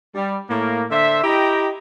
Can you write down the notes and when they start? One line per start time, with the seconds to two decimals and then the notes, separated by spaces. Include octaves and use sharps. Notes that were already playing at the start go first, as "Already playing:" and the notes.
0.15 G3
0.50 A2 A#3
0.91 D3 C5 E5
1.24 E4 G4 D#5 G5 A#5